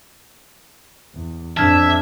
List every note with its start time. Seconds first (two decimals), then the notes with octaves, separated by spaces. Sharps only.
1.15 E2
1.57 F2 D4 E5 A5 F6 G#6